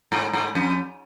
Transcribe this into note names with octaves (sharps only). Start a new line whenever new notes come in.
G#2
G#2
F2